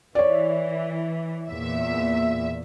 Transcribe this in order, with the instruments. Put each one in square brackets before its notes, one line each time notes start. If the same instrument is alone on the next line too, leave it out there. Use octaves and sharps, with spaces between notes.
[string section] E3 [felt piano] C#5 D5
[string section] E2 A#2 E5